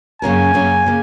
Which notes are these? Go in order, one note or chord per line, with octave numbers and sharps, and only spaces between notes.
F#2 C#3 A#3 C#4 A#4 G#5
F#2 C#3 A#3 C#4 A#4
C#3 A#3